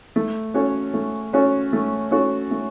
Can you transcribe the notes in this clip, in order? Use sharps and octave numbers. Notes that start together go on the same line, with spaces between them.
A3
C#4 F#4 A4 C#5
A3
C#4 F#4 A4 C#5
A3
C#4 F#4 A4 C#5
A3